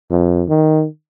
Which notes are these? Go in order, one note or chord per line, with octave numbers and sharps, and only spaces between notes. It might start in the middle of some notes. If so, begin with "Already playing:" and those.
F2
D#3